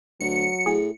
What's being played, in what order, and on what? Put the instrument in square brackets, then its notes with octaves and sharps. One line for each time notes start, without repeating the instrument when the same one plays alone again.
[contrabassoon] D2 [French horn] F#3 [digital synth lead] C#7
[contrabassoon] A2 [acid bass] G#4